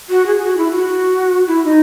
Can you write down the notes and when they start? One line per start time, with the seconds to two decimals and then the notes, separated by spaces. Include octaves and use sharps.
0.09 F#4
0.26 G#4
0.43 F#4
0.57 E4
0.71 F#4
1.47 E4
1.64 D#4